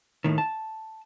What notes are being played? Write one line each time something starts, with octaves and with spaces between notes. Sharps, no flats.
D#2 A2 D#3
A5